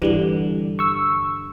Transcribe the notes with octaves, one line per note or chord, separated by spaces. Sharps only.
G2 D3 E3 G3
C#6 E6